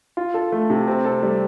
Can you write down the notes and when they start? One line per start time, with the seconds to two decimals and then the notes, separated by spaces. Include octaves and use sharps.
0.17 F4
0.34 A4
0.52 A3
0.70 C3
0.88 C4
1.05 A4
1.23 G3